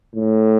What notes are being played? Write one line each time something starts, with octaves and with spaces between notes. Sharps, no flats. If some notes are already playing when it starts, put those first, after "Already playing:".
A2